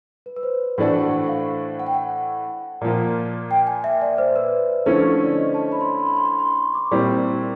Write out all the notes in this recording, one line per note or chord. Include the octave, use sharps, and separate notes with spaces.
B4
B4
C5
C#5
A2 E3 A3 D4 F#4 C5
F5
F#5
G5
F#5
A#2 F3 A#3
G5
G#5
E5
D5
C5
B4
D3 F3 A3 C#4 E4 C5
C5
C#5
D5
D#5
A5
B5
C6
B5
C6
B5
C6
B5
C6
C#6
D6
A#2 G3 C4 E4 C#6